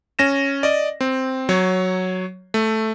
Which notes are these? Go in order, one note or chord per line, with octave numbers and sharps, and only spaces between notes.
C#4 A#6 E7
D5 D#5
C4
F#3 C#5
A3